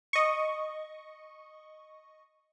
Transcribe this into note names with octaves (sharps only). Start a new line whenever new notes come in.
D#5 C#6